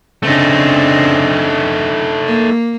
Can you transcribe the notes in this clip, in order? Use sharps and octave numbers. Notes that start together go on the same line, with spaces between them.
C#3 A3 C4 D4 D#4
A#3